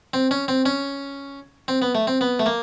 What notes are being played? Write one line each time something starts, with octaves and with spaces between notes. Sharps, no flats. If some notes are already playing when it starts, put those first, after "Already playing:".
C4
C#4
C4
C#4
C4
B3
A3
C4
B3
A3
A#3